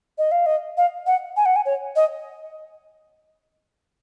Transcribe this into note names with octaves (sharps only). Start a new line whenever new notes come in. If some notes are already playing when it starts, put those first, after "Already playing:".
D#5
F5
D#5
F5
F#5
G#5
F#5
G#5
C#5
D#5